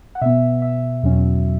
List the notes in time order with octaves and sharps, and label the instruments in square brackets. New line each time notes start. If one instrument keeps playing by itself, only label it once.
[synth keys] F#5
B2 B3 E5
E5
E2 B2 F#3 C#4